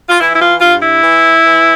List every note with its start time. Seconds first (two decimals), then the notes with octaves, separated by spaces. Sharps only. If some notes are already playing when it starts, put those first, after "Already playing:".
0.09 F4
0.19 E3 E4
0.33 E4
0.40 F4
0.60 G2 F4
0.81 E4
1.03 E3
1.44 E3